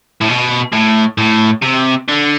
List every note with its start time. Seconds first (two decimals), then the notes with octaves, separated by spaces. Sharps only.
0.21 A2
0.28 B2
0.72 A2
1.18 A2
1.63 C3
2.08 D3